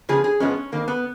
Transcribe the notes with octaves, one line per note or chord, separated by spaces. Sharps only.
C#3 F3 B3 G#4
G#4
G#2 F3 G#3 B3 C#4
F2 D#3 A#3
B3